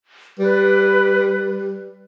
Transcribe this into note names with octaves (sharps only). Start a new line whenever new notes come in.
G3 B4